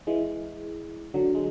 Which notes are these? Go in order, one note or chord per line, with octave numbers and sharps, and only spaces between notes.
E3 G#3
D3 F#3
G#3